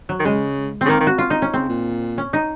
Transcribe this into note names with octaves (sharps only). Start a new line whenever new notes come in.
F#3
D#3
C#3 G#3
C#3 C4
D#3 A#3
D#3
F#4
F4
D#4
C#4
C#3 C4
A#2
C#4
D#4